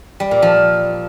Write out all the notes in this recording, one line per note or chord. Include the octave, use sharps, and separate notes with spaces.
G3
A#2
F3